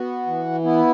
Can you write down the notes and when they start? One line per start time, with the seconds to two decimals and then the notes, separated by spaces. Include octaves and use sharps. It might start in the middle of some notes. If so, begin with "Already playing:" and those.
Already playing: B3 F#4
0.26 E3
0.64 B3 E4